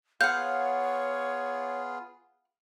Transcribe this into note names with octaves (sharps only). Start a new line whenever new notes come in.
B3 F4 G#4 C#5 F5 F#5 G6